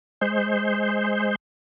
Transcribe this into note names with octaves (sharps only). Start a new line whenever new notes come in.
G#3 C5